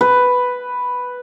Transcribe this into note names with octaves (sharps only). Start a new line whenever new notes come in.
B4